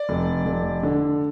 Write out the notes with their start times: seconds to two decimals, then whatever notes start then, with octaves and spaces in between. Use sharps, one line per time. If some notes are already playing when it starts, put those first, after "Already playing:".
Already playing: D5
0.09 F1
0.45 F1
0.83 D3